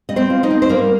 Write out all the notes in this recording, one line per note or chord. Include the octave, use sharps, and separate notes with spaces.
G3 D#5
C4 C5
F4
D#4 D#5
C4
C5
G3 A#3 A#4